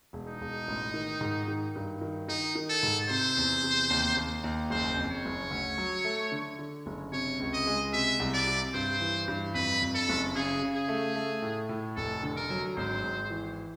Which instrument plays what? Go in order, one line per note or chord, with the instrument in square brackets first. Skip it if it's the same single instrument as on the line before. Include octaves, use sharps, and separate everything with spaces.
[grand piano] E1
[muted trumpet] D#4
[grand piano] E1
A1
D#3
G#2
D#3
G2
D#3
[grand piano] D#3 [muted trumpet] D#4
[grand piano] D#3
[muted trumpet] A4
[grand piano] G#2
[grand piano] C3 [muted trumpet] C5
[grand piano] E2
C3
D#2
D#2
D#2
[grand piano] F#1 [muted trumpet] C5
[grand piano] F2
[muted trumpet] C#5
[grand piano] F#1
D2
F#3
A3
D3
D3
F#1
[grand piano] C3 [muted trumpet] C#5
[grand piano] C#2
[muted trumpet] D#5
[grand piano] G#3
[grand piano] C3 [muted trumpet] E5
[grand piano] C2
[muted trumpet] D5
[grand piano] C3
[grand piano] G2 [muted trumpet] C5
[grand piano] E3
G2
[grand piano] F2 [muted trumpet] B4
[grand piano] F2
[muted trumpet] A4
[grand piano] F#1
[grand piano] C#3 [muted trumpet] G#4
[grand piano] C#3
[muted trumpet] G#4
[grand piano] A3
A3
A2
A2
[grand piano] F1 [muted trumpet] A4
[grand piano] D3
[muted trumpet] A#4
[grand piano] F#3
[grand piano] G#1 [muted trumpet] C5
[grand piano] G#1
E3